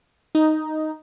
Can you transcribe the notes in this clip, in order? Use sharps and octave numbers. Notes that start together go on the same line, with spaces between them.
D#4